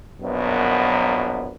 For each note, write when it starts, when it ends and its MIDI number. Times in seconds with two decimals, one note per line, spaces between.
0.21 1.54 34
0.21 1.54 42
0.21 1.54 47
0.21 1.54 54
0.21 1.54 59